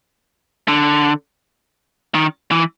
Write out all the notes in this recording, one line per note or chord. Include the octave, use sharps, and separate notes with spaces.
D3
D#3
E3